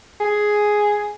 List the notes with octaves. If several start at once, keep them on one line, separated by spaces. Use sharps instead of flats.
G#4